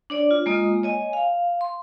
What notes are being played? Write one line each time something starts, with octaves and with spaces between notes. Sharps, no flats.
D4 C#5 D5
F4
G#3 A#3 F4 D#5 D#6
C#5 D#5 G#5
F5
C6